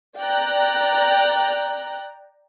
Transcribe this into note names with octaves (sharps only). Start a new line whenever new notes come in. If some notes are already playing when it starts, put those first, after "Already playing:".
D5 G5 A#5 F#6